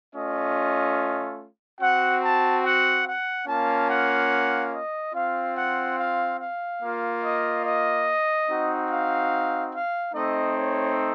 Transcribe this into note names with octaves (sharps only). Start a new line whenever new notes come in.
A3 C#4 F4 D#5
C4 F#4 F#5
A5
F#5
F#5
A#3 C#4 F4 A5
F#5
D#5
C4 F4 F5
F#5
F5
F5
A#3 F4
D#5
D#5
C4 D#4 F#4
F5
F5
A3 C4 D#4 D#5
C#5